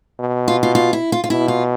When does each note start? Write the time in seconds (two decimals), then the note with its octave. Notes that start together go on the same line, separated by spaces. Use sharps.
0.20 B2
0.48 F4
0.63 F4
0.75 F4
0.93 E4
1.12 F4
1.24 F4
1.30 B2 E4
1.48 F4